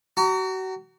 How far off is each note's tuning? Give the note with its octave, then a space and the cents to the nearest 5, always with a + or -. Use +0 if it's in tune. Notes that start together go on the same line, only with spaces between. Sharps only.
F#4 +35 A#5 -25